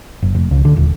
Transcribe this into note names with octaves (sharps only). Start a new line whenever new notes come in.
F#1
F1
C#2
D3
D#1